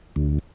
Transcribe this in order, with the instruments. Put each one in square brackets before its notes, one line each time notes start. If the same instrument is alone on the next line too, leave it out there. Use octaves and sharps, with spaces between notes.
[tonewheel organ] D2